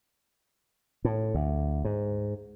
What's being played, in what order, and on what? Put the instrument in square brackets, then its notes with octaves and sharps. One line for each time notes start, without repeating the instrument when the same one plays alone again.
[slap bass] A2
D2
G#2